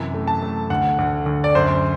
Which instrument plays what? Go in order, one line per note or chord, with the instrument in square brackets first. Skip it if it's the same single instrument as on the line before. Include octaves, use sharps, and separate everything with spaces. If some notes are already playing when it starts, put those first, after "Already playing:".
Already playing: [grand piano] F#2 C3 E3
A3
A5
A3
D2 F#5
D2
D2
D5
F#2 C5